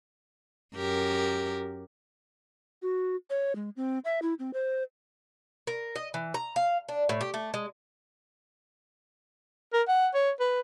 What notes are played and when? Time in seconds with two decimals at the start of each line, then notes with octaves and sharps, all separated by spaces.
0.76 F#2 G4 A#4
2.82 F#4
3.30 C#5
3.56 G#3
3.77 C4
4.05 E5
4.22 E4
4.39 C4
4.54 C5
5.67 A#4
5.96 D#5
6.14 E3
6.34 A#5
6.56 F5
6.89 D4
7.09 A2
7.21 G4
7.34 A3
7.54 G#3
9.73 A#4
9.88 F#5
10.14 C#5
10.40 B4